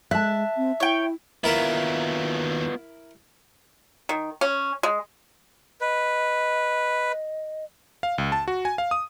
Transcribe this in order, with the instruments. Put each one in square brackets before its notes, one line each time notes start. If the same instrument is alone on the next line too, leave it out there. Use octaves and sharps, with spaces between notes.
[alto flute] G#3 [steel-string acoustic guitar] E5 A5 [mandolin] F#6
[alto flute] C4
[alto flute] E4 [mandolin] C#5 G5
[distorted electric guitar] D#2 F#3 [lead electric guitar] B3 F4 [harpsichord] E4 A#4 E5
[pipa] D#3
C#4
G#3
[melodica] B4 [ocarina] D#5
[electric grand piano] F5
C#2
A5
F#4
G#5
F5
D#6